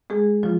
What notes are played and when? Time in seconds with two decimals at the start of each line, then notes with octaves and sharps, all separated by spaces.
0.10 G#3 G#4
0.43 F3 F4